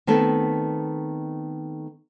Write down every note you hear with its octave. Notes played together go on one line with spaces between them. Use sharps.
D#3 A3 B3 C4 A4